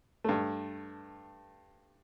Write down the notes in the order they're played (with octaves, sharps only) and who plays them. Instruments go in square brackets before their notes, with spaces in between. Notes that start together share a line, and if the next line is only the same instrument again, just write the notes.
[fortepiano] G2 A3